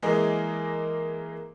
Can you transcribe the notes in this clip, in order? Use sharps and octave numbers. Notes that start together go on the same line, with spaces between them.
E3 G#3 A#3 G#4 A#4 D#5